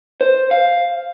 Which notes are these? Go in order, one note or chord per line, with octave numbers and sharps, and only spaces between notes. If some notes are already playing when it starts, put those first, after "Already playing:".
C5
F5